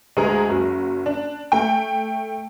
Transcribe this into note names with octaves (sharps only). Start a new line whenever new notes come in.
D2 G#3 G#4 A#5
F#1 F#3
D4
A3 G5